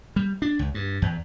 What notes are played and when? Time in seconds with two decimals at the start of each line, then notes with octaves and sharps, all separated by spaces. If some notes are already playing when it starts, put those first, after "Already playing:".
0.16 G3
0.42 D4
0.59 C#2
0.74 G2
1.02 E2